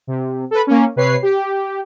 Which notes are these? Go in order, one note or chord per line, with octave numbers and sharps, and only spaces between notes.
C3
A4 B4
A#3 C#4
C3 B4 C#5 C7
G4